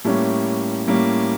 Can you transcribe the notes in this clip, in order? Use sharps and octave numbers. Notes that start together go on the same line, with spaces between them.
A2 G3 A#3 C#4
A2 G3 A#3 C#4